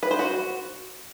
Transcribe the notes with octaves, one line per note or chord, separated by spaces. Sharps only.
B4
C5
F#4